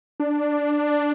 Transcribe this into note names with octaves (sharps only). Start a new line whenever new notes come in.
D4